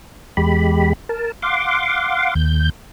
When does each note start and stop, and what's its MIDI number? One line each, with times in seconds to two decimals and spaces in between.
0.37 0.93 40
0.37 0.93 56
0.37 0.93 67
0.37 0.93 83
1.09 1.32 70
1.09 1.32 81
1.42 2.34 77
1.42 2.34 78
1.42 2.34 84
1.42 2.34 86
2.35 2.70 39
2.35 2.70 91